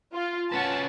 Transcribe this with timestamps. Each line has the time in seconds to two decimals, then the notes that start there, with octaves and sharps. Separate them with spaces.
0.14 F4
0.52 C#4 B4 F#5 G#5 A5